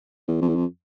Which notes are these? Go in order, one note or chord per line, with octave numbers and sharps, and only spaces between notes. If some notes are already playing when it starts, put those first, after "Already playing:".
E2
F2
E2
F2